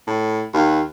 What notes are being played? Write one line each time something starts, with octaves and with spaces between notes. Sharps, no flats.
A2
D#2